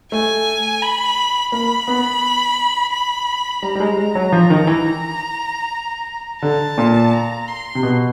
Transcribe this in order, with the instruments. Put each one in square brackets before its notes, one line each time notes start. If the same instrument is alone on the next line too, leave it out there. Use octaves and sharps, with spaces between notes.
[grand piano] A3 [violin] G#5
[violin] B5
[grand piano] A#3 [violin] B5
[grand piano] B3
[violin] B5
[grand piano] G3 [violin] A#5
[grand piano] G3
G#3
G#3
F#3
F3
D#3
E3
[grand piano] D3 [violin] A5
[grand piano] A#2
[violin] A#5
C6
[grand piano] C3
B2